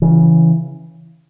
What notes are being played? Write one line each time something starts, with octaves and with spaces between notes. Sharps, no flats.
C#3 E3